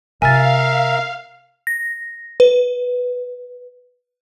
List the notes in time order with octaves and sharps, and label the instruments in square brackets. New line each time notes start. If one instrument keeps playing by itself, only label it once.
[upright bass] C3 F4 [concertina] A#4 E5 [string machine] F5 [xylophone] G#5 A6
[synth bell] A#6
B4